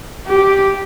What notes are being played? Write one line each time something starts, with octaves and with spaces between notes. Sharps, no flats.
G4